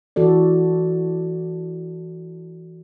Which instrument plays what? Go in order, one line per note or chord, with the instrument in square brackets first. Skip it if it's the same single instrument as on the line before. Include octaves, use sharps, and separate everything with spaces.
[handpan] E3 F#4 A4 D5